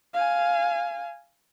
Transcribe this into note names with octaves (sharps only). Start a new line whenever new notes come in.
F5 G#5